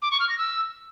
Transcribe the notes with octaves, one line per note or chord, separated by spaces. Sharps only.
D6
C#6
F6
A#6
E6